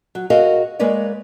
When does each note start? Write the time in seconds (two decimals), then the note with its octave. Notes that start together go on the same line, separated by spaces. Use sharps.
0.15 F#3
0.30 F#4 G#4 A#4 D#5 F5
0.79 G#3 A#3 A#4 B4 C#5 D5